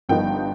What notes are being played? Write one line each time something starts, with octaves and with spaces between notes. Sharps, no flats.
G1 G2 F3 B3 D#4 G5